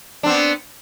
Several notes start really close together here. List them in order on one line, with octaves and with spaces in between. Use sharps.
D4 C4 B3